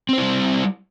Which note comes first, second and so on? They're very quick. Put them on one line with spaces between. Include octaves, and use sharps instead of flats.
C4 C5 E4 G3